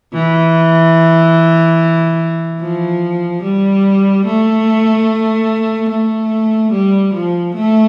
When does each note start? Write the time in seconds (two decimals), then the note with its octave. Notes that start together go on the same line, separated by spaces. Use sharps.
0.13 E3
2.60 F3
3.43 G3
4.25 A3
5.89 A3
6.72 G3
7.14 F3
7.55 A3